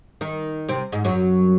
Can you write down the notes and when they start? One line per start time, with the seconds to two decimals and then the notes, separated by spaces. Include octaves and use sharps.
0.21 D#3 D#4
0.69 C3 C4
0.92 G#2 G#3
1.05 F#2 F#3